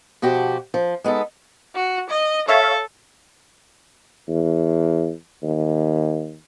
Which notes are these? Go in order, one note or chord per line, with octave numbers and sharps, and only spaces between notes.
B2 F3 F#4 G4
F3
G#3 B3 D#4 A4
F#4
D#5
A4 C#5 E5 F5
E2
D#2